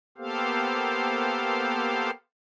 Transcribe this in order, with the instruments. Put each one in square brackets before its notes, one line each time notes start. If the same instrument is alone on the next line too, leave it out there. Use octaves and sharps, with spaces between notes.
[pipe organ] A#3 B3 G4 A4 C5 F5